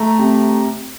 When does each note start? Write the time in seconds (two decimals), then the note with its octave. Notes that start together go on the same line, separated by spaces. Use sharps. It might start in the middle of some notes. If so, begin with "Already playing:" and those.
Already playing: A3 A#5
0.18 C3